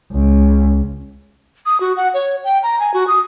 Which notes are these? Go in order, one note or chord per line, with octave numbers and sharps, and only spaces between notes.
C#2
D#6
F#4
F#5
C#5
G5
A#5
G#5
F#4
D#6